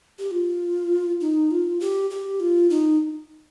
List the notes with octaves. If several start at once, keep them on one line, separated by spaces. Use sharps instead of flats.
G4
F4
D#4
F4
G4
G4
F4
D#4